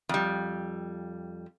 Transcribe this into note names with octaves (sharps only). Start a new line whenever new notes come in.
F2 G3